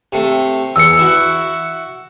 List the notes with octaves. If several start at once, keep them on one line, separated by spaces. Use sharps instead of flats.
C3 A3
E2 E6 C#7
E4 F#4